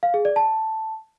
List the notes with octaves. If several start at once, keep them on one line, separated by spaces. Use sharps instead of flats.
F5
G#4
D5
A5